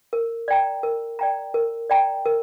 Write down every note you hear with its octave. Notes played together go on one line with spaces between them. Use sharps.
A#4
D5 G5 A#5
A#4
D5 G5 A#5
A#4
D5 G5 A#5
A#4